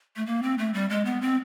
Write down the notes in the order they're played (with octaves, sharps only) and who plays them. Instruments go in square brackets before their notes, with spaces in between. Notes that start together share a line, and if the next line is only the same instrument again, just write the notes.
[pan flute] A3
A#3
C4
A3
G3
G#3
B3
C4